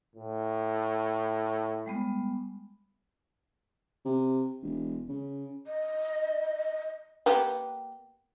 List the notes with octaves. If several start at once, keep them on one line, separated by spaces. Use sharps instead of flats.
A2
G3 G#3 B3
C3
E1
C#3
D#5
A#3 B3 G4